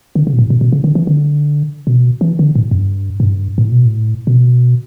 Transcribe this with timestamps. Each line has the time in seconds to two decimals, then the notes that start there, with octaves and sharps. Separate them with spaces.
0.15 D3
0.27 C#3
0.33 B2
0.39 A2
0.50 B2
0.61 B2
0.73 C#3
0.84 D3
0.95 E3
1.07 D3
1.87 B2
2.21 E3
2.39 D3
2.55 A2
2.71 F#2
2.78 G2
3.20 A2
3.24 G2
3.58 A2
3.72 B2
3.86 A2
4.27 B2